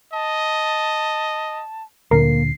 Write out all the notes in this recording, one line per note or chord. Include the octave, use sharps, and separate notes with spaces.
D#5 A5
D2 A#2 D3 A#3 C7